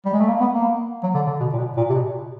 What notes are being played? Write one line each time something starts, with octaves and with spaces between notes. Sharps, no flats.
G3
G#3
A3
A#3
B3
A#3
F#3
D3
D3
B2
A#2
B2
A#2
C3
B2